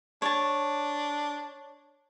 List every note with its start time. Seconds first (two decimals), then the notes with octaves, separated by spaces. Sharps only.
0.22 D4 C#5 A5